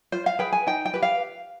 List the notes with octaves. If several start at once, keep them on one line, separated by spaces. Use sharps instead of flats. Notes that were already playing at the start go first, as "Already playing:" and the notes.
F4 C5
F5
G#4 B4 G5
G#5
D#4 G5
G5
G4 B4
F5